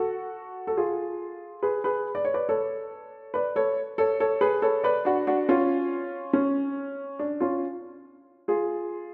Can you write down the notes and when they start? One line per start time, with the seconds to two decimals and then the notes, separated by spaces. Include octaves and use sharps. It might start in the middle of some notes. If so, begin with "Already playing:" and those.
Already playing: F#4 A4
0.67 A4
0.77 F4 G#4
1.63 G#4 B4
1.84 G#4 B4
2.15 D5
2.25 C#5
2.34 B4 D5
2.49 A4 C#5
3.34 B4 D5
3.56 A4 C#5
3.98 A4 C#5
4.20 A4 C#5
4.41 G#4 B4
4.62 A4 C#5
4.84 B4 D5
5.05 D4 F#4
5.27 D4 F#4
5.49 C#4 F4
6.33 C#4
7.19 D4
7.40 C#4 F4
8.48 F4 G#4